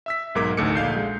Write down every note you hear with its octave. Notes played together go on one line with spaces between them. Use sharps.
E5 E6 B6
B1 G#2 A#4 D6 G#6 B6
A1 D2 D#4 A4 D6 C#7
A#1 F5 G6 C7
G#3